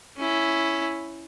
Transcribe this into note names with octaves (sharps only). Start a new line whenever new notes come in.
C#4 E4